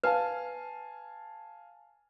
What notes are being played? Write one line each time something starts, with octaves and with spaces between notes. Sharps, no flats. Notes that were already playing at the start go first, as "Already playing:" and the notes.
B4 F5 G#5 A5